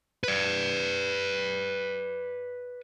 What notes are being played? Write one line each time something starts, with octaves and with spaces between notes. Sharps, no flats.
B4 D5